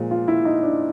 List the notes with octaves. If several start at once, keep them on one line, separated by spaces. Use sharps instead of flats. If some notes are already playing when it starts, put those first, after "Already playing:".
Already playing: A#2 F3 G#3
F4
E4
D#4
D4